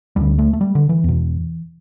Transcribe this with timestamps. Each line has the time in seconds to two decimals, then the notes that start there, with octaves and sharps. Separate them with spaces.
0.16 D2 D3 G3
0.39 A3
0.53 A3
0.61 G3
0.75 D3
0.89 E3
1.04 E2 B2